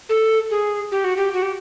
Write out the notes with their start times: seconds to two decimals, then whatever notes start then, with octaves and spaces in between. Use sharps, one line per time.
0.09 A4
0.51 G#4
0.92 G4
1.04 F#4
1.17 G4
1.34 F#4
1.43 G4